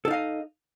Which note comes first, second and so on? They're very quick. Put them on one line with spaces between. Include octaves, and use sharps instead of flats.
A4 D#4 F5 D#5